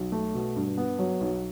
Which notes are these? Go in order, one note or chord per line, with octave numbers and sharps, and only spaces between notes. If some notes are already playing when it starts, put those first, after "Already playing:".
Already playing: B1
A3
B2
G2
B3
F#3
B1